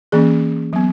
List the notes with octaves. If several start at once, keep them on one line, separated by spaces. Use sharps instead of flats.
E3 A#3 C#4 G#4
F#3 B3